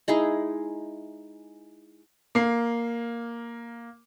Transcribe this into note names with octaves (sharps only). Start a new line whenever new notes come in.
G#3 D#4 E4 G#4
A#3 C7